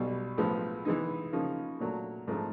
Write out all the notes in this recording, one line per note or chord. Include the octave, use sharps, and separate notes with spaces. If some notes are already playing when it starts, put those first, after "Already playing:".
Already playing: B1 B2 G3
B1 A2 F3 G#3 B3
E3 G#3 B3 D#4
C#3 F3 A#3 D#4
A#2 F#3 A3
G#2 F3 A3 C4